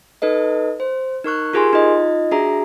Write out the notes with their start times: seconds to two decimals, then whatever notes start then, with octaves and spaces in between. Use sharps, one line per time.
0.22 D#4 A4 B4 D#5
0.80 C5
1.24 D#4 A#4 C#6 F#6
1.53 F4 G4 G#4 A#4 G#5 C6
1.73 D#4 F4 D#5
2.31 D4 F#4 G#4 E5 A#5